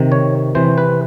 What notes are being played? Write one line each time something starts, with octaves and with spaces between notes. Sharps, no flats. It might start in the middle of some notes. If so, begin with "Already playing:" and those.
Already playing: C3 D#3
C#5
C3 E3 C5
B4